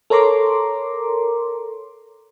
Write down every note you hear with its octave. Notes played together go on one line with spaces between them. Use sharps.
A4 A#4 C#5 A#5 C6 D6